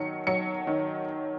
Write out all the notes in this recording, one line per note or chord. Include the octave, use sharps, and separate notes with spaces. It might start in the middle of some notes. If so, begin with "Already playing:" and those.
Already playing: D#3 F#3 C#7
F#3 C#7
D#3